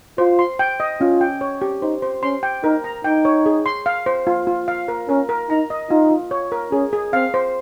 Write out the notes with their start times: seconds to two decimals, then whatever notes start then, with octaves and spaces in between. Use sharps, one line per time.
0.18 F4 C5
0.39 C6
0.59 G5
0.80 D#5
1.01 C#4 F4
1.21 G5
1.41 C#5
1.62 G4
1.82 D#4 C5
2.02 C5
2.23 C#4 C6
2.43 G5
2.64 D#4 A#4
2.84 A#5
3.04 D#4 G5
3.25 C#5
3.46 G#4
3.66 C6
3.86 F5
4.06 C5
4.27 F4
4.47 F4
4.68 F5
4.88 A#4
5.09 C#4 A#4
5.29 A#4
5.49 D#4 A#5
5.70 D#5
5.90 D#4 F4
6.10 F4
6.31 C#5
6.52 A#4
6.72 C#4 G#4
6.93 G#4
7.13 C4 F5
7.34 C5